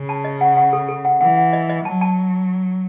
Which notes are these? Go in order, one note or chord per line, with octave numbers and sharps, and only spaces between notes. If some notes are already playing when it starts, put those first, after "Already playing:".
Already playing: C#3
A5
D#5
F#5
F#5
A4
A4
F#5
E3 F#5
F#5
D#5
D#5
F#3 A5
A5